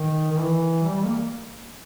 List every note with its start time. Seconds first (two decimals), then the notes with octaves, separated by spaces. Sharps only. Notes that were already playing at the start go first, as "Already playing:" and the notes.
Already playing: D#3
0.32 D#3
0.38 E3
0.83 G3
1.05 A#3